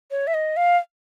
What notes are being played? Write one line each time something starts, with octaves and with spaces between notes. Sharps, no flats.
C#5
E5
D#5
F5